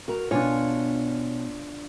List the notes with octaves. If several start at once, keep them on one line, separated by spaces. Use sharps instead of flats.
F#4 A#4 A#5
B2 D4 F4 C#5 G#5